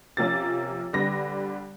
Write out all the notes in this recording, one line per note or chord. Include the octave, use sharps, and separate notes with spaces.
C3 F3 A#3 C#4 A6
D3 G3 B3 A#6